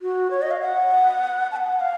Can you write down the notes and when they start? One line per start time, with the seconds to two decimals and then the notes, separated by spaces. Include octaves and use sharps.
0.02 F#4
0.31 C#5
0.42 D#5
0.51 F5
0.61 F#5
1.51 A5
1.56 F#5
1.80 F5